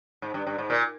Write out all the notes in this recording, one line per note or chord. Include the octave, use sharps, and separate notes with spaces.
G#2
G2
G2
G#2
A#2